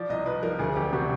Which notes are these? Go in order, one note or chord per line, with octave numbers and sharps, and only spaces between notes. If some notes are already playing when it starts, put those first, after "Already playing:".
Already playing: F3 D5
C2 D#5
F3 B4
F3 A#4
D2 G#4
E1 G4
C3 F#4